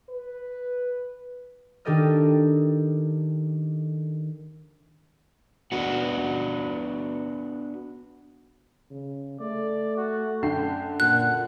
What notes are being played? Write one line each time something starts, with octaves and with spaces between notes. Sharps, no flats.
B4
D#3 D4 G4 A4 D#5 F6
B3 D4 F#4
C#3
A3 D5
F#4
F#2 D3 G5 C7
A#2 F#5 F#6